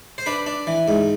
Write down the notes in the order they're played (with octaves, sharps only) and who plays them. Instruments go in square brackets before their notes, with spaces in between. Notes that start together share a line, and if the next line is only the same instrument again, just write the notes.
[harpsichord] C5
D4 B4
D4
E3
G#2